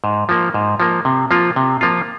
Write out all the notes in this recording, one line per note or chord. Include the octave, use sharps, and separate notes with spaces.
G#2
F3 A#3
G#2
F3 A#3
C3
F3 A#3 F4
C3
F3 A#3 F4